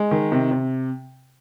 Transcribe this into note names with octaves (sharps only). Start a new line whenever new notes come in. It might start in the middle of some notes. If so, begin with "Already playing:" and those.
Already playing: G#3
D#3
C3
C3